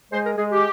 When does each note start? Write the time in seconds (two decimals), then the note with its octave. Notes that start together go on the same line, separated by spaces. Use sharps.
0.12 G#3 C5
0.25 A#4
0.38 G#3 G#4
0.51 G4